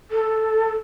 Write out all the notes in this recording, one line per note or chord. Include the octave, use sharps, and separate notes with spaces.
A4